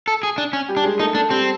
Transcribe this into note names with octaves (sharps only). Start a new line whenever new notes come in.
A4
G#4
D4
C#4
G3 G4
D4
G#3 G#4
A3 D#4 A4
A3 D4 A4
G3 C4 G4